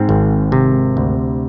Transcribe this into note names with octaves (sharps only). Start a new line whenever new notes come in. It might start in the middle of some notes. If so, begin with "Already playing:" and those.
Already playing: G#2 C4
G#1
C3
D2